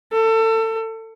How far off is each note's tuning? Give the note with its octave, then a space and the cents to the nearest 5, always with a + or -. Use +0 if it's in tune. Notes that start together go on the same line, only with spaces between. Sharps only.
A4 +30